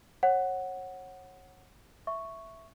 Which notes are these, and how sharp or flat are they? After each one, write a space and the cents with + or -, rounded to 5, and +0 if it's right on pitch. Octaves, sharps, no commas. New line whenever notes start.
C#5 -30 F#5 +0
E5 +0 C#6 +0